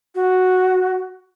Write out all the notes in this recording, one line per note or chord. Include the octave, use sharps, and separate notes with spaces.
F#4